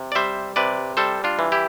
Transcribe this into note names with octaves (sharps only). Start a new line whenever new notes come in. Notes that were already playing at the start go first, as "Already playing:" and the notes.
Already playing: C3
D5
G3 C5 E5
C3 B4 D5
G3 A4 C5
D4 F4
E3
E4 G4